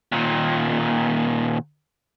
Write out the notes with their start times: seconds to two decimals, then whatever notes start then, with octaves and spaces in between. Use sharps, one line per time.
0.12 D#2 A#2